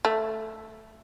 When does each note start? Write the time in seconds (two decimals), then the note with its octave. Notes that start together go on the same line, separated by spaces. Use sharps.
0.05 A3